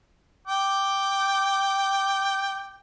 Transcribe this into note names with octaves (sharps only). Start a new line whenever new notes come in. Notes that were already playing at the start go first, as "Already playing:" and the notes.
G5 D6